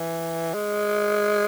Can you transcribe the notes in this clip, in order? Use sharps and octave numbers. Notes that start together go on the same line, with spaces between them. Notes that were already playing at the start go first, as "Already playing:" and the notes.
Already playing: E3
G#3